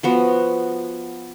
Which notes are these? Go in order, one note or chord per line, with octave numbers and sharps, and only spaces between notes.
F3 B3 F#4